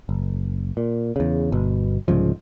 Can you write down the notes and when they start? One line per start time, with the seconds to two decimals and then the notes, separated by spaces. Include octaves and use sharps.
0.09 F#1
0.77 A#2
1.16 E2 C#3
1.52 G1 B2
2.08 C2 G#2 C#3 F3